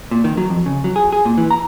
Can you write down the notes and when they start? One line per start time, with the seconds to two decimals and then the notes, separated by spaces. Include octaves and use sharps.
0.11 A#2
0.24 D#3
0.37 F#3
0.50 F2
0.66 C#3
0.84 F#3
0.96 G#4
1.12 G#4
1.25 A#2
1.38 E3
1.51 A#5